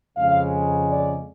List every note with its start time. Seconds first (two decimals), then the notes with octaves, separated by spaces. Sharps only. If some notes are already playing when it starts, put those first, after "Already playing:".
0.17 F2 C#3 G#3 F5
0.89 D5